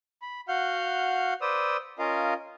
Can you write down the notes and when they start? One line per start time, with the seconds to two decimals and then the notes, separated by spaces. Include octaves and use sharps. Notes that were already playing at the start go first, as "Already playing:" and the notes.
0.22 B5
0.48 F#4 F5 F#5 F6 G6
1.41 B4 C5 D5 D#6 E6
1.99 C#4 F4 A#4 D#5 F5